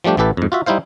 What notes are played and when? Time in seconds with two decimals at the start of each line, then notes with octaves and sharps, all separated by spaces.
0.04 F3 G3 A3 D4 G4
0.17 A1 E3 G4 A4 B4
0.37 F2 G#2
0.52 F4 F#4 E5
0.66 G3 D#4 E4 C5 F5